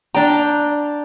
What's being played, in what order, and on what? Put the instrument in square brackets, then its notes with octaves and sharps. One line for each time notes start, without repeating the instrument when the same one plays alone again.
[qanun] D4 G5 [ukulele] A#5